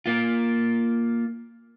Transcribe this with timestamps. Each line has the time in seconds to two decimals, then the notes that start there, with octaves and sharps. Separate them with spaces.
0.06 A#3 F4